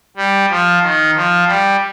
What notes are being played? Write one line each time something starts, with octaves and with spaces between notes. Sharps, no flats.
G3
F3
D#3
F3
G3